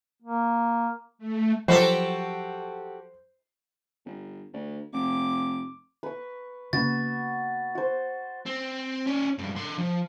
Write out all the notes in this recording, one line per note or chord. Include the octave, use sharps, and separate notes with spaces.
A#3
A3
F3 F#3 F#4 G4 A4 C5
G1
D2
F1 D6
B4 C#6
C#3 A#3 B3 F#4 A6
F#4 C5
C4
C#4 D4
C#2 G2
D3 C6
F3